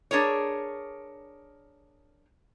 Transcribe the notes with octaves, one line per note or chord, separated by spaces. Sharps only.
D4 G#4 A#4 C#5